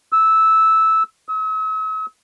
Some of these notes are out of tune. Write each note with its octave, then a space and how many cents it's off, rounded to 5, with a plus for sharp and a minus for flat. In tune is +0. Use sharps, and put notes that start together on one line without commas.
E6 -10
E6 -45